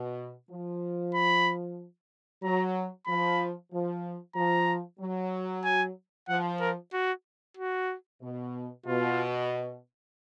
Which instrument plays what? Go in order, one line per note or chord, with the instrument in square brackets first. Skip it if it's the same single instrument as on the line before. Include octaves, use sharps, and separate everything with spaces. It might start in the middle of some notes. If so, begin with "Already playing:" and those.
Already playing: [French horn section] B2
F3
[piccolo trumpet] B5
[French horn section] F#3 [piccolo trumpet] A#5
[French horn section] F3 [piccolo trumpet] B5
[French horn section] F3
[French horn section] F3 [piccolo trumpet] A#5
[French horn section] F#3
[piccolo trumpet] G#5
[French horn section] F3 [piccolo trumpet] F#5
[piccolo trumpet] A#4
F#4
F#4
[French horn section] B2
[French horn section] B2 [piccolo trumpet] F4